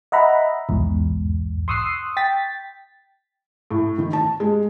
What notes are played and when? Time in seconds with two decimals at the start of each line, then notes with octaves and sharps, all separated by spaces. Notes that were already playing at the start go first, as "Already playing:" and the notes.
0.12 D#5 E5 F#5 A#5 B5
0.69 B1 E2 G#2
1.68 C6 C#6 D#6 E6 F#6 C7
2.17 G5 A6 B6
3.71 A2
3.98 D#3
4.13 A5
4.40 G#3